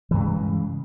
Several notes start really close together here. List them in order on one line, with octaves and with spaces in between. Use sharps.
E3 G2 G#3 C#3